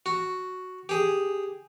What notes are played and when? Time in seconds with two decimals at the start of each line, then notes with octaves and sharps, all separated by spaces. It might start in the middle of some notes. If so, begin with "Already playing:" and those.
0.06 F#4
0.89 G4 G#4